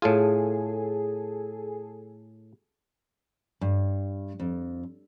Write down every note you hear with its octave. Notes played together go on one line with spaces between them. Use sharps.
A2 F4 G#4 A4
G2
F2